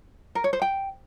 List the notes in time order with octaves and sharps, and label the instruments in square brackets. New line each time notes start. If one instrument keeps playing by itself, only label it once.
[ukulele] A#4
C#5
C5
G5